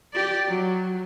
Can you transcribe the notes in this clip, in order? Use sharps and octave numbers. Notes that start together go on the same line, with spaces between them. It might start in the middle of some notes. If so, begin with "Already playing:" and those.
G4 D5
F#3